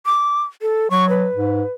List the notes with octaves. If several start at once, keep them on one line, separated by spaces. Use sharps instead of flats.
D6
A4
F#3 C#6
B4
G#2